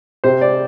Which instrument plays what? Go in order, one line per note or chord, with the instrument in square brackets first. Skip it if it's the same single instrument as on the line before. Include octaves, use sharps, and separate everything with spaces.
[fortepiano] C3 C5
D5